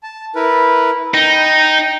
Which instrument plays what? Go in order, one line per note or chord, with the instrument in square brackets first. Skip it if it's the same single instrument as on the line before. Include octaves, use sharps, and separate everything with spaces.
[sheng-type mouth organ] A5
E4 A#4 B4
[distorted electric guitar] D#4 [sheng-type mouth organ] G5